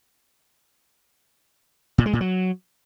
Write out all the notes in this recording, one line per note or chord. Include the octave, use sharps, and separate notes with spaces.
A#2
G#3
A#2
F#3